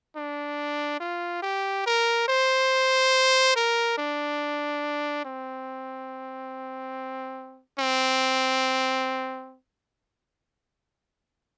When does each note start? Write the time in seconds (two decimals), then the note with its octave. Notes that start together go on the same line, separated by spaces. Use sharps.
0.16 D4
1.00 F4
1.42 G4
1.86 A#4
2.28 C5
3.56 A#4
3.98 D4
5.25 C4
7.79 C4